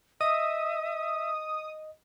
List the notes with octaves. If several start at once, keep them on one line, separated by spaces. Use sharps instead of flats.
D#5 E5 D#6